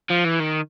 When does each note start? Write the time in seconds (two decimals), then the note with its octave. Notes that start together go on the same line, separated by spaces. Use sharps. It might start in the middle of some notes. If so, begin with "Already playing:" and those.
0.10 F3
0.24 E3
0.39 D#3